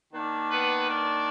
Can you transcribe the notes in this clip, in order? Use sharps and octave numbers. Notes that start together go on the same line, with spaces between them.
D#3 A#3 D4
B3 B4
D4 D5